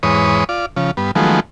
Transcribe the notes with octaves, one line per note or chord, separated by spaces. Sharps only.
E2 G#2 B4 C#5 D#6
F4 D5
C#3 F3
G2 B3
D#3 F3 F#3 G#3 A3 B3